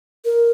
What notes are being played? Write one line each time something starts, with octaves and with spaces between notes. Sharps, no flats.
A#4